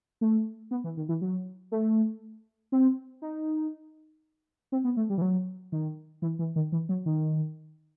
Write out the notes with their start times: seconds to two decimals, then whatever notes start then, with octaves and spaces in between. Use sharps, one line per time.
0.21 A3
0.71 B3
0.84 E3
0.97 D#3
1.09 E3
1.21 F#3
1.72 A3
2.72 C4
3.22 D#4
4.72 C4
4.84 B3
4.97 A3
5.10 G3
5.18 E3
5.22 F#3
5.72 D#3
6.22 E3
6.39 E3
6.56 D#3
6.72 E3
6.89 F#3
7.06 D#3